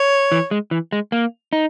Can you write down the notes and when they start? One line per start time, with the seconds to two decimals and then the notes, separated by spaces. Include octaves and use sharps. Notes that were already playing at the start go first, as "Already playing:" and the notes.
Already playing: C#5
0.32 E3
0.51 G#3
0.71 E3
0.92 G#3
1.12 A#3
1.53 D#4